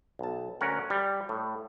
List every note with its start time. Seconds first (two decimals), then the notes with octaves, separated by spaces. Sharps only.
0.19 B1 A5
0.61 D2 C#4 A#4 F#5
0.90 G3
1.29 A2